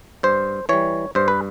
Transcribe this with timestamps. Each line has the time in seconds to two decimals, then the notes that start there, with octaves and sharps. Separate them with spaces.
0.23 G2 C5
0.69 E3 G3 C#5
1.15 G2 C5
1.28 B4